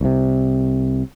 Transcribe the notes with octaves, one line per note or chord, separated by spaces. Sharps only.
C2 C3